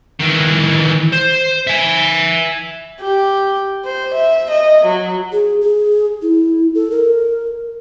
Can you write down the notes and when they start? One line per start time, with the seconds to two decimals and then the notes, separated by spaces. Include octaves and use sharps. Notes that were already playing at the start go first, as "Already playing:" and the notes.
0.20 D#3 E3
1.13 C5
1.67 E5 G#5
3.01 G4
3.85 C5
4.15 E5
4.51 D#5
4.86 F#3
5.32 G#4
5.61 G#4
6.22 E4
6.75 A4
6.91 A#4